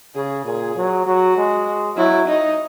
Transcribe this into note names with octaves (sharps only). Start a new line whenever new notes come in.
C#3 G#4
A#2 G#4
F#3
F#3 F#4
G#3
F#3 E4
D#4